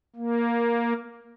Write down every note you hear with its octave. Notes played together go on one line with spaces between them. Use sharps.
A#3